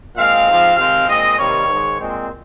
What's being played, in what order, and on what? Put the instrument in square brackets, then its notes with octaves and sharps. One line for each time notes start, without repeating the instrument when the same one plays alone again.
[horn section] A#2 G#3 C4 F5
G#2 F3 C4
C3 D#3 G#3 C4 F5
A#2 G#3 C4 D#5
C3 D#3 G3 A#3 C#5
G#2 D#3 G#3
A#2 G#3 C4